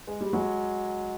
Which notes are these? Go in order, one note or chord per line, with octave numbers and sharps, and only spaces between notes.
G#3
G3
F#3 G#3